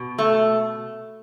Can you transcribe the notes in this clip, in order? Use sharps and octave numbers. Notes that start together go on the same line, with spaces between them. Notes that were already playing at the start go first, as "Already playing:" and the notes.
Already playing: B2
A3